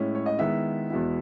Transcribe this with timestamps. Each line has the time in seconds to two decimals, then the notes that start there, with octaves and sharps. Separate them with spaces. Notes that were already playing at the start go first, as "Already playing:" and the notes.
Already playing: A2 G#3 C#4 E4
0.15 C#5
0.26 D#5
0.38 D#3 G#3 B3 E4 E5
0.90 E2 B2 G#3 B3 E4